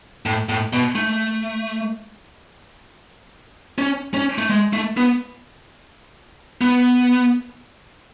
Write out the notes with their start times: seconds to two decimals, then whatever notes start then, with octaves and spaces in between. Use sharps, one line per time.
0.26 A2
0.49 A2
0.73 B2
0.95 A3
3.78 C#4
4.14 C#4
4.38 A3
4.50 G#3
4.73 A3
4.97 B3
6.61 B3